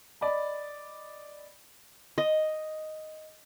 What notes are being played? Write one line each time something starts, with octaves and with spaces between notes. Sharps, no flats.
D5 D#5 B5
D#5